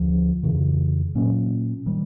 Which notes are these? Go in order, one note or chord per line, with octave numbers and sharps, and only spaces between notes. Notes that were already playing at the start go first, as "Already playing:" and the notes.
Already playing: D2 D3 F3
F2 C#3 E3
A#2 F#3 A#3 C#4
D#3 G3